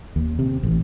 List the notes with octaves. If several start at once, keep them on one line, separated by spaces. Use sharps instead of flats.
D#2
C3
A1